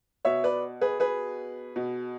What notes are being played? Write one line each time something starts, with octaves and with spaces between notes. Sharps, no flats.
B2 C#5 E5
B4 D5
G#4 B4
G#4 B4
B2